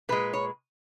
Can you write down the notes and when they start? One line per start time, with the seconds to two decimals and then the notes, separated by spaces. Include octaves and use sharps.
0.09 A#2 G#3 B4
0.33 C#5